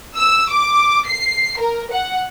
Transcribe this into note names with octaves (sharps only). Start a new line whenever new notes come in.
E6
D6
C7
A#4
F#5